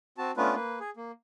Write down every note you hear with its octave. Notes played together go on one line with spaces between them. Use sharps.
C4 F#4 A5
A3 B3 C#4 D4 F4 B4
A#3 B4
G#4
A#3